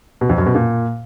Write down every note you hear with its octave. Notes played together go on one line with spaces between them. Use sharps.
B2
F2
F#2
B2
A#2